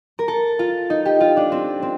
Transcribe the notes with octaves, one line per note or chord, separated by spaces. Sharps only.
A#4
A4
F4
D#4
G4
F4
D4
C4
C4